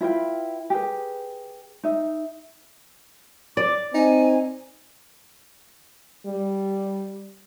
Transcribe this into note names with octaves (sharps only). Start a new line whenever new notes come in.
E4 F4 B4 G5
G4 G#4 B4
D#4 E5
D5 D6
C4 D#4 G#5
G3